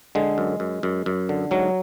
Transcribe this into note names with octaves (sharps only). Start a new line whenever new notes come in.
D3 G#3
F#2
F#2
F#2
F#2
D3
G#2 F#3